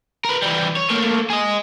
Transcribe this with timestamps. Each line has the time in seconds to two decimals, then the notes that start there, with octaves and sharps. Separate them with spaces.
0.25 A#4 B4
0.42 E3 G3
0.77 C#5
0.90 A3 A#3
1.30 G#4 D#5